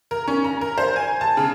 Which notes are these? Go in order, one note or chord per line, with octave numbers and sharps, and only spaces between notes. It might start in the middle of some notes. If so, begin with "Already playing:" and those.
A#4
C#4
A#5
A#4
C5
G#5
A5
C#3